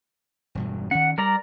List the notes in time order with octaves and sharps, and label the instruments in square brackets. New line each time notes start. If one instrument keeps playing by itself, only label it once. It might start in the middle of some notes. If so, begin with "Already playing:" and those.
[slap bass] E1 G2 B2
[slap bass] D#3 C#4 [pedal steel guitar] F#5
[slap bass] G3 [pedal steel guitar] A#4 D5 A#5